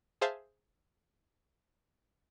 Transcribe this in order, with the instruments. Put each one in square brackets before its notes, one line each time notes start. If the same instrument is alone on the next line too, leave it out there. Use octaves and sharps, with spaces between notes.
[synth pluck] G#4 C5 E5 F5 A5